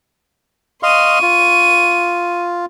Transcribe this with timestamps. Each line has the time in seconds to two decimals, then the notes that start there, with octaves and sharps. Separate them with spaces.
0.83 D#5 F5 C6 C#6 D#7
1.22 F4